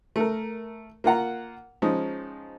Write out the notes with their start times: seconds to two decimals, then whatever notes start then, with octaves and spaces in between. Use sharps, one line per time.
0.16 A3 A#4
1.04 A#3 F4 F#5 A#5
1.82 F3 G#3 C#4 D#4